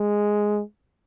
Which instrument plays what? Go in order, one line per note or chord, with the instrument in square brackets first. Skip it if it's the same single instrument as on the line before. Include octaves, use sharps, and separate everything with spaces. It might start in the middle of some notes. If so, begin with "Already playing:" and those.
Already playing: [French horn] G#3